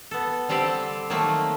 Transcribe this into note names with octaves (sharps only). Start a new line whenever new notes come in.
B3 A4
D3 G3 C4 G4 A4 D5
D#3 F#3 A3 A#3